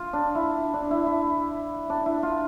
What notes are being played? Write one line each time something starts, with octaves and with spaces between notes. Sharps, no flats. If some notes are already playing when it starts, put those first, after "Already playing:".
Already playing: F4
D4
E4
D4
E4
E4
D4
E4
F4